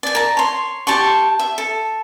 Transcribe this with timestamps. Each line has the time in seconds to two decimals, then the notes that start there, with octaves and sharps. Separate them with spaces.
0.03 D5 G#5
0.15 A#4 A5
0.37 C#5 C6
0.87 G4 A5 C6 C#6
1.39 E5
1.58 A4